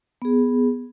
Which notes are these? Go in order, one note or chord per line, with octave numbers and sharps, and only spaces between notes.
B3 G#4